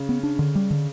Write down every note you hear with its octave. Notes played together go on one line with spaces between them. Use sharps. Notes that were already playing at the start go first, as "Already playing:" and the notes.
Already playing: C#3
B3
D4
D3
G3
D3